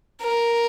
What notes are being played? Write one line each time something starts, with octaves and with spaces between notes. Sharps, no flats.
A#4